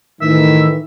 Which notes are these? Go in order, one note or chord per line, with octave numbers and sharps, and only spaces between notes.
A2 D#3 E3 E5